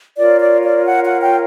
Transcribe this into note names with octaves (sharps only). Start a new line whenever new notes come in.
F4 A#4 C#5 D5
D5
D5
F#5
F#5
G5